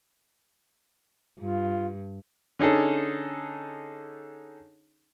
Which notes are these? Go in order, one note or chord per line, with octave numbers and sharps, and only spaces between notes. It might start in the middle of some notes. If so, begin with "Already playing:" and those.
G2 F4
D3 C#4 D#4 G#4 A4